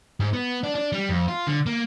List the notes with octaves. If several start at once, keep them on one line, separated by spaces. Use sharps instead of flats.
G#2
B3
D4
D4
G3
F2
F4
D3
A#3